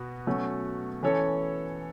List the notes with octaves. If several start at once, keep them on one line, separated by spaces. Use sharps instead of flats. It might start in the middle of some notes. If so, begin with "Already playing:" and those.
Already playing: B2 B3 F#4
B2 F#3 A3 C#4 F#4
E3 C#4 A4 C#5